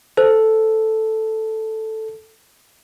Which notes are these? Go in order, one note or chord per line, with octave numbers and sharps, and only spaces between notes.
A4 C5